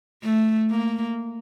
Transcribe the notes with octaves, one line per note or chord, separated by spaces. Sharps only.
A3
A#3